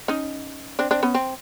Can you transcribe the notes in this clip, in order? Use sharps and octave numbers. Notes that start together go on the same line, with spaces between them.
C#4 D#4
C4 D4
C4 D4
B3 C#4
C4